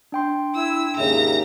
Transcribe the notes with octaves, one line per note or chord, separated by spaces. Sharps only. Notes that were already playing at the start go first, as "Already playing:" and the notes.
D4 G5 C6
E4 E6
D#2 G#2 C#3 E5 A#5